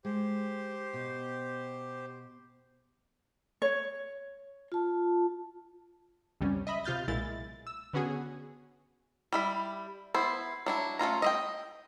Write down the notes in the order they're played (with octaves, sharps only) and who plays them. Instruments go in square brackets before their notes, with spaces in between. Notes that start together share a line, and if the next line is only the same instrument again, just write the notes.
[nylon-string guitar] G#3 [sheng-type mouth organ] G4 C5
[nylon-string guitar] B2
[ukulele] C#5
[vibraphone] F4 A5
[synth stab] C#2 F#2 C3 G3 C#4
D#5 E5 B5
C3 F4 F6 G6 A6
B1 A#2 G#3 E4 A6
E6
D3 B3 C#4 F#4 G#4
[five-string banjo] G3 E4 B5
B3 E4 C5
F#3 D4 E4
A3 C#4 F4 A#5
D#5 E5 G5